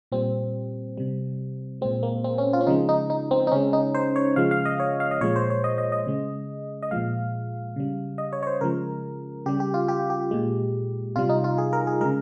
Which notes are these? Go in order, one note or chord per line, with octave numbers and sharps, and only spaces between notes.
A#2 G3 C4
C3 G3
A#2 G#3 C4
A#3
C4
C#4
F4
C#4
C#3 F3 G#3 D#4
D#4
D#4
C4
D#4
C#3 G#3 C#4
D#4
C5
C#5
C#3 F3 G#3 F5
F5
D#5
C#5
F5
D#5
A#2 F3 G#3 C#5
C5
C#5
D#5
D#5
D#5
C#3 G#3
D#5
A#2 F3 G#3 F5
C#3 G3
D#5
C#5
C#5
C5
C#3 F3 G#3 A#4
C#3 G3 G4
G4
F4
G4
G4
A#2 G#3
C3 G3 F4
D#4
F4
G#4
A#4
G#4
C#3 G#3 A#4